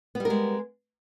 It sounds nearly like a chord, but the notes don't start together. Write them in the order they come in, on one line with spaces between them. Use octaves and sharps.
B3 G3 A#4 G#3